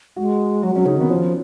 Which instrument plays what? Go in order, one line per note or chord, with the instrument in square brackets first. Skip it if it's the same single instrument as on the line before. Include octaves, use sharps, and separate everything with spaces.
[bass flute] G#3 [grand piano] F#4
[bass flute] F#3 [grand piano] F#4
[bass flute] F#3 [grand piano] C#4
[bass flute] C#3 [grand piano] D#4
[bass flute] D#3 [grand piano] B3
[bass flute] F3 [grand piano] C#4